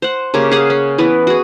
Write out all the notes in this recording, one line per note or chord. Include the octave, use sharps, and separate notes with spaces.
C5 F#5
C#3 A#3 G4 C#5
G#4 C#5 F5 F#5
C#4
E3 B3 B4
F#4 G#4